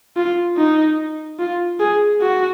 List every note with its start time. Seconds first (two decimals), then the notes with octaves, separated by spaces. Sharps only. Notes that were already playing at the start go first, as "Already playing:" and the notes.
0.16 F4
0.57 D#4
1.39 F4
1.80 G#4
2.21 F#4